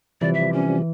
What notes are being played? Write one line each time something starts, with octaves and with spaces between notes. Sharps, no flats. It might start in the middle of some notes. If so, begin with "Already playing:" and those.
C3 E3 F3 G3 D5
E5
C#4